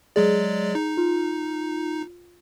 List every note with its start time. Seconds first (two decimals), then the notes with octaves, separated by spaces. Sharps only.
0.16 F#3 G#3 G#4 D5
0.75 D#4
0.97 F4